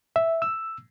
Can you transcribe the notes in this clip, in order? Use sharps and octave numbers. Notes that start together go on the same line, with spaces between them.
E5
E6